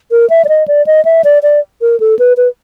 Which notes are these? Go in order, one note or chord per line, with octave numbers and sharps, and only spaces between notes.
A#4
E5
D5
D#5
D5
D#5
E5
D5
D5
A#4
A4
B4
B4